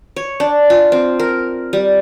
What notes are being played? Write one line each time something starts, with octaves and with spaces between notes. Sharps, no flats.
C#5
D4
F4
C4
A#4
G3